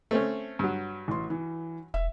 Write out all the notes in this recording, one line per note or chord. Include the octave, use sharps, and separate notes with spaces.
A3 C4 C#4
G2 F#3
A1 C6
E3
E1 E5